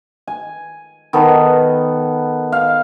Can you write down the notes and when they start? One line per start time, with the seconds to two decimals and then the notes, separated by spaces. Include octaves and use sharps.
0.27 G#5
1.13 D#3 B3 A4
2.52 F5